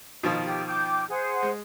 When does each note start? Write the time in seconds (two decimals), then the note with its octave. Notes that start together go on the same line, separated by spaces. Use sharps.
0.23 B2 D#3 F3
0.45 G4
0.66 G5 D6 G6
1.08 G#4 C5 F#5
1.43 G#3